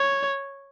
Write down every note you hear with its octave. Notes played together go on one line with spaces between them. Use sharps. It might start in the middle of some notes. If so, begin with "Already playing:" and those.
Already playing: C#5